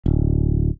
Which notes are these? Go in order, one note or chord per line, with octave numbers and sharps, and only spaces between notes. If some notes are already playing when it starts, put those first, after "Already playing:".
D1